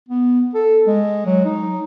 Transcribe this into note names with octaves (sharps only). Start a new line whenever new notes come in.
B3
A4
G#3
F#3
D#4